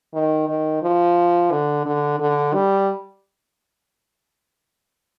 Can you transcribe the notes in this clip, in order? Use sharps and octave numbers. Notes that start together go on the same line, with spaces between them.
D#3
D#3
F3
D3
D3
D3
G3